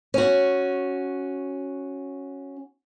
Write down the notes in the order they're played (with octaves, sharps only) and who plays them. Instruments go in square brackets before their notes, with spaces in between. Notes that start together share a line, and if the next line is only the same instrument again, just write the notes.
[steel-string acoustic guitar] C#4 F#4